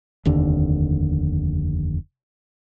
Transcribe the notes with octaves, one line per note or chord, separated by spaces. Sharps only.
F1 D#2 D3